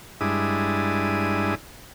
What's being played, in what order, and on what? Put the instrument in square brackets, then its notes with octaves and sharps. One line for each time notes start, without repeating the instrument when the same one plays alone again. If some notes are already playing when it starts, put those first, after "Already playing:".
[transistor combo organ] G2 G#3 D4 E4 D#6